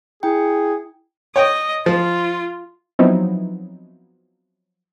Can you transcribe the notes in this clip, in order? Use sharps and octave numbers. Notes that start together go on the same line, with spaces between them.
E4 G#4 G5
C#5 D#5 G5
F3 F4
F3 F#3 B3 C4 D#4 E4